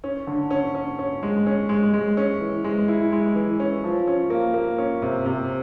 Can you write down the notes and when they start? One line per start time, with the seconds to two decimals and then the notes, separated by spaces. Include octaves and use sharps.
0.04 C#4
0.27 D3
0.50 C#4
0.75 C#4
0.99 C#4
1.23 G#3
1.46 C#4
1.69 G#3
1.93 G#3
2.17 C#4
2.41 E3
2.64 G#3
2.88 E4
3.12 G#3
3.35 E3
3.60 C#4
3.84 F3
4.07 C#4
4.30 A#3
4.54 A#3
4.78 C#4
5.02 C3
5.26 C3